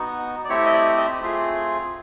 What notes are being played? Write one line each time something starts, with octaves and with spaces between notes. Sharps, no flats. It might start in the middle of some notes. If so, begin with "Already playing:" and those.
Already playing: B3 D#4 F#4
D5
A3 C4 E4 G4 C#5
D#5
D5
D#5
A3 C4 F4 G#4